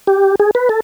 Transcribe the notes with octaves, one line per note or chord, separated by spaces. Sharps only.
G4
G#4
B4
A4